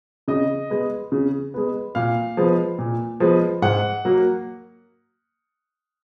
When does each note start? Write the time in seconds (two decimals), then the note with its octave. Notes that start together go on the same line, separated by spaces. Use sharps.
0.28 C#3 D#5
0.70 G#3 B3
1.12 C#3
1.54 G#3 B3
1.95 A#2 F5
2.37 F3 G#3 B3
2.79 A#2
3.20 F3 G#3 B3
3.62 G#2 F#5
4.05 F#3 A#3